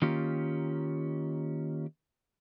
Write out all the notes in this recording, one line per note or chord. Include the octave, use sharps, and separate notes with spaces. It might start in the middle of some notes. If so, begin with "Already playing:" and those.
D#3 A#3 C#4 F4 G4